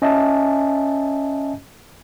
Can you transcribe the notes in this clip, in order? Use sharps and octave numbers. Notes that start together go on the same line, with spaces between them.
C#4 D#5 E5 G#5 A5